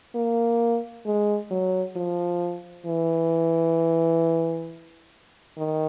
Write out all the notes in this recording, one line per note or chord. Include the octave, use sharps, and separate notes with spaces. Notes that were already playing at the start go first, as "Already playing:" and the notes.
A#3
G#3
F#3
F3
E3
D#3